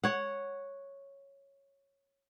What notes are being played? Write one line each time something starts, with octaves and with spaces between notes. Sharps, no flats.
C#5 F#5